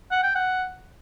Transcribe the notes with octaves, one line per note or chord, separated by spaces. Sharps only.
F#5
G5
F#5